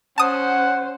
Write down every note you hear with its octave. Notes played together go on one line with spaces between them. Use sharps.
C#4 C5 F#5 A5 D#6